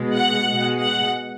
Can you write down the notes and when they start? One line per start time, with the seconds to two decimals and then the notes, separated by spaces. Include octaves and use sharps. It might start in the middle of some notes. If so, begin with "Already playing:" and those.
Already playing: B2 G#3
0.14 F#5
0.48 B2 G#3
0.82 F#5